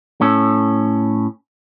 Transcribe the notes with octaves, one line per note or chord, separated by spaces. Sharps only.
A2 C#4 A4